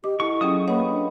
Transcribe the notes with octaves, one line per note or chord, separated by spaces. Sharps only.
G4 D#5 D6
E4 F#4 A4 C#6
F#3 C#4 F4 G4 G#4 D#6
A#3 B4 C#5 D#5 F#5
D4